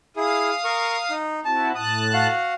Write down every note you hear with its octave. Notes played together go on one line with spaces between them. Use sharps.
E4 G#4 F5 D#6
A#4 C#6
D#4
C4 E4 F#4 A5
A2 A5 D#6 F#6
F#4 F5 F#5